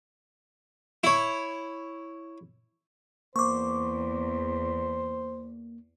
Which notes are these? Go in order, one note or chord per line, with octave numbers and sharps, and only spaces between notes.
E4 C#5
E2 A#3 C5 C#6 D6